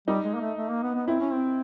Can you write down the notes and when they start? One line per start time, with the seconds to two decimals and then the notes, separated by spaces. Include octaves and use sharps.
0.08 G3 D#4
0.24 G#3
0.35 A#3
0.41 A3
0.57 A3
0.69 A#3
0.83 B3
0.95 B3
1.07 C4 E4
1.20 C#4
1.32 C4